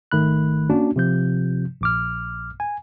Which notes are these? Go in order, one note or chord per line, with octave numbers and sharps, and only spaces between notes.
G#1 D#3 A3 B5 F#6
A#3 C#4 D4 F#4
C3 F3 G6
A#1 D6 F6
G#5